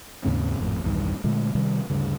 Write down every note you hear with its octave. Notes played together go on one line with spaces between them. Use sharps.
D#2 G#2 C#3 C4
G#1 F2 A2
B1 E2 G2 D#3
A#2 D3 G#3 A3
C3 D#3 G3
D2 G2 C#3